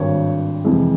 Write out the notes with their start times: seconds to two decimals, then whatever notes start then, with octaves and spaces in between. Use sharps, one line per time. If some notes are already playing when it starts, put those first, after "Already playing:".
Already playing: G#1 G2 D#3 C#5
0.64 F2 C3 E3 G#3